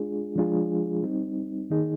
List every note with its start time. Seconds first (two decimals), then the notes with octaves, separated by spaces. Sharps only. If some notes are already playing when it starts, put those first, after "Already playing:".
Already playing: G#3 D4 F4 G#4
0.36 F3 G#3 D4 F4 G#4
1.03 G3 C4 D#4
1.70 D#3 A#3 D#4 G#4